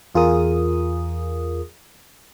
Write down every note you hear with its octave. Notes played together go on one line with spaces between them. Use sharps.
E2 F4 G#4 A#4 D#6